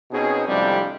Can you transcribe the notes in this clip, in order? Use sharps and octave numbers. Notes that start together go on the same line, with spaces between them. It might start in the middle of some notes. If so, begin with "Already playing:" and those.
B2 C4 C#4 D#4 G#4
F2 A2 C3 G3 G#3 D4